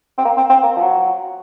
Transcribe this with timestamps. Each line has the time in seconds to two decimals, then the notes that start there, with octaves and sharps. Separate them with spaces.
0.18 C4
0.25 A#3
0.37 C4
0.50 C4
0.63 A#3
0.77 F3
0.82 F#3